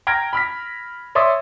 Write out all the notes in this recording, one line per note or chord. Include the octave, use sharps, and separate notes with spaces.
G5 A#5 F6 G#6 A#6 D7
B5 F6 B6
C#5 D5 E5 C6 C#6 D#6